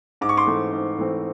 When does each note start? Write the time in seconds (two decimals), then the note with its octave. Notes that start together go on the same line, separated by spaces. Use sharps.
0.21 G#2 D6
0.29 C#6
0.37 C6 D6
0.47 E3 A3 C4
0.73 G#2
0.99 E3 A3 C4